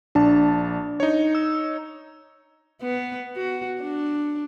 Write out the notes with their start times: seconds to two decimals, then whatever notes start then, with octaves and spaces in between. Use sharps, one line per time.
0.15 A#1 D4 A5
1.00 D#4 C#5
1.35 E6
2.82 B3
3.37 F#4
3.82 D4